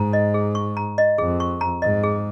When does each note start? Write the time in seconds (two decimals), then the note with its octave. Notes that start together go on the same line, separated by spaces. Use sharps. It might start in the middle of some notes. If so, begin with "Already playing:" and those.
Already playing: G#2 A#5
0.13 D#5
0.34 G#4
0.55 C#6
0.77 A#5
0.98 D#5
1.18 F2 G#4
1.40 C#6
1.61 A#5
1.82 G#2 D#5
2.03 G#4